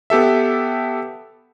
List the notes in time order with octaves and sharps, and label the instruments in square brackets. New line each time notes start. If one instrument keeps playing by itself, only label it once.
[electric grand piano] B3 G4 A4 E5